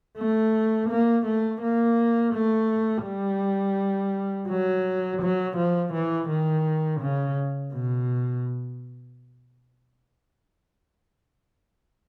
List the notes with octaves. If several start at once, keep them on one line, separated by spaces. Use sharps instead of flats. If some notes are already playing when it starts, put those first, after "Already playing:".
A3
A#3
A3
A#3
A3
G3
F#3
F#3
F3
E3
D#3
C#3
B2